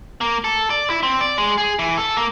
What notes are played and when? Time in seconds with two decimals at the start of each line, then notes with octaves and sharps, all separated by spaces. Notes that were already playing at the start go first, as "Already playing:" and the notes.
0.21 A#3
0.44 A4
0.70 D5
0.90 E4
1.03 C4
1.21 D5
1.38 G#3
1.58 G#4
1.79 E3
1.98 A4
2.17 A#3